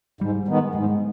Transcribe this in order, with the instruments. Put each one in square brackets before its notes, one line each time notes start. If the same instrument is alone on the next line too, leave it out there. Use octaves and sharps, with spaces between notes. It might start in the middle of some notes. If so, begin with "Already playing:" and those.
[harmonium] G#2 [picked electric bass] G3
[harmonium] D#3 G#3 B3
[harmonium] G#2 [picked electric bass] G#3